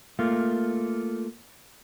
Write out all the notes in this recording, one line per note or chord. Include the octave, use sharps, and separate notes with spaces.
A3 A#3 F4